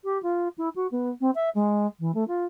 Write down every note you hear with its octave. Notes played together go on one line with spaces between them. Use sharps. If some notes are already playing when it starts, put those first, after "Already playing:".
G4
F4
E4
F#4
B3
C4
E5
G#3
E3
A3
F4